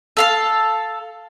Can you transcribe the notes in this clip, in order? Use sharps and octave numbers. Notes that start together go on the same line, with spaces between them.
A4 F5 F6